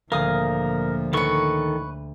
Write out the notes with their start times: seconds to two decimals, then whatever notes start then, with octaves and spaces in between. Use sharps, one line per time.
0.12 D2 A#2 F3 G#4 A#4 F5 D#6
1.13 D#3 A4 B4 C#5 C#6